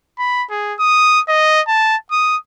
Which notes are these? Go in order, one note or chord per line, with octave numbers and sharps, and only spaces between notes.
B5
G#4
D#6
D#5
A5
D#6